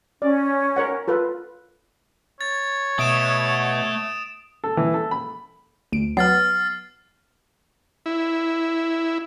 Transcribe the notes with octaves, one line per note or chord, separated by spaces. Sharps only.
C#4 D5
A#4 C#5 F#5
F4 A4 B4
C#5 A6
B2 A3 E5 D#6 D7 E7
A4
E3
A4
B5
D2 D7
F#3 B3 F6 A6 C7
E4